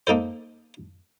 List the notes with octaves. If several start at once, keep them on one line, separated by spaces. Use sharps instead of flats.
A#3 D#4 A4 C5